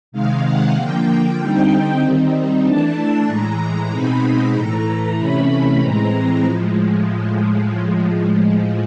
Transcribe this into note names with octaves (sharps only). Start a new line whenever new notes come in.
C3 D#3 G#3 F5
F#5
D3 F3 A#3 G5
D3 G3 C4 D#4 G5
D#3 G3 C4 D#4
E3 A3 D4 A5
A2 E3 G#3 A#5
B2 G#3 C4 D#4 B5
A2 E3 A3 A#5
C3 E3 A3 C#4 B5
A2 E3 G#3 C4 A#5
A2 F3 G#3